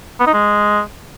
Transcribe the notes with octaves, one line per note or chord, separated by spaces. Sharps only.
B3
D#4
G#3